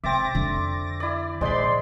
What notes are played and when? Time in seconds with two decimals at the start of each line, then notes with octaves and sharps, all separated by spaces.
0.04 C3 C4 E5 D6 A6 A#6
0.35 F2 D3
1.00 E4 D5
1.41 A#1 D3 G#3 C5 D5 B5 C6